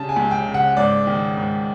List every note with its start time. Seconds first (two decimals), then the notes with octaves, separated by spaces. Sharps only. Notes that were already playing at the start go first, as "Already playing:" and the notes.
Already playing: C#3 G3 A5
0.09 G#5
0.16 C#2
0.31 G5
0.46 C#3
0.54 F#5
0.77 G#2 D5
1.07 D#3
1.37 G#2